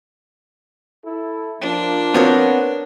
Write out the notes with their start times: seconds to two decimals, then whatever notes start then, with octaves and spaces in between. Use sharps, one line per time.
1.04 E4 A4
1.62 F3 A#3 D4
2.14 B3 C4 A#4 C#5 F5